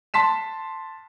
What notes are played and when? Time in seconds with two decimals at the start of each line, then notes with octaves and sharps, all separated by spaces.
0.14 A5 C6 B6 E7